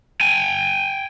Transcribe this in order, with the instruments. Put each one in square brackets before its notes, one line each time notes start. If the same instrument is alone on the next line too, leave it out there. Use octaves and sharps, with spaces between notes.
[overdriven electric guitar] G5 G#5